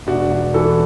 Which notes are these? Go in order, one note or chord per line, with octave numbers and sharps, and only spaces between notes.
E1 D4 F#4
E1
E3 F#4 A4